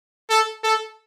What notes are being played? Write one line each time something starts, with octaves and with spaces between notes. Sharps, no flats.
A4
A4